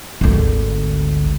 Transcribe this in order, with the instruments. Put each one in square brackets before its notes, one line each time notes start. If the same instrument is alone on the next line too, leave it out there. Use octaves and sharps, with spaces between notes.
[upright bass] G#1 D2